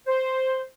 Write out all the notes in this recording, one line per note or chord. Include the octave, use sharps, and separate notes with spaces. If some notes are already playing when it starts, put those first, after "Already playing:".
C5